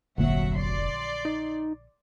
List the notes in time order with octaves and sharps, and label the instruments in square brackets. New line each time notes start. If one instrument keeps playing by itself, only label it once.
[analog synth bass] F1 [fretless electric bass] A#1 D3 A#3 [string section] F#3 E5 F#5
[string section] D5 C6
[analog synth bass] D#4